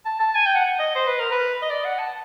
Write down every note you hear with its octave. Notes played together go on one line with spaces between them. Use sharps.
A5
A5
G#5
G5
F#5
D#5
C5
B4
A#4
B4
D#5
D5
F#5
A5